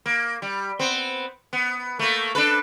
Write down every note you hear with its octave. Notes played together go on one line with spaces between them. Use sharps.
A#3
G3
B3 C4
B3
A3 A#3
D4 A4 B4